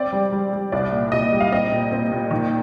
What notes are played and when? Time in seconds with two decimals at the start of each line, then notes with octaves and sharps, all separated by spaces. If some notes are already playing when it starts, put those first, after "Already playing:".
Already playing: C4 D5
0.13 G3
0.32 G3
0.53 G3
0.72 C2 D5
0.92 A#2
1.12 C2 D#5
1.32 G3
1.40 F5
1.52 C4 D#5
1.72 A#2
1.92 C4
2.12 A#2
2.31 D#3